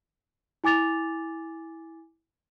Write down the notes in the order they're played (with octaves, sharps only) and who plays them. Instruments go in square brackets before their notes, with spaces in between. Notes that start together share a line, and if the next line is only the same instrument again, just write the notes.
[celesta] E4 G#5 D6 A6 F7